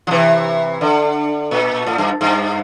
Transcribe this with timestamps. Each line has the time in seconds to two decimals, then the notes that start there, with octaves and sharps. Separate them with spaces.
0.07 F3
0.11 C3 E3
0.81 D3
1.51 A#2
1.86 A2
1.98 G2
2.21 G2